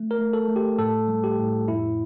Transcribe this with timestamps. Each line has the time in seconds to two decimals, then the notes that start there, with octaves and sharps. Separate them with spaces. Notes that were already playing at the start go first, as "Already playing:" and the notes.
Already playing: A3
0.11 A#4
0.19 A3
0.33 A4
0.48 A3
0.56 G4
0.78 A2 A4
1.08 G3
1.24 G4
1.39 A2
1.68 F2 E4